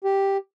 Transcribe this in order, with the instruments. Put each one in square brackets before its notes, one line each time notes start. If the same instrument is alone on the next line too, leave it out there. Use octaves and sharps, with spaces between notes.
[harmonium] G4